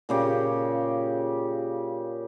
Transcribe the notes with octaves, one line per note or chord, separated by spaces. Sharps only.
A#2 C#3 G4